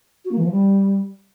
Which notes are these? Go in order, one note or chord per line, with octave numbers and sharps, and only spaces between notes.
F#4
A#3
E3
F3
G3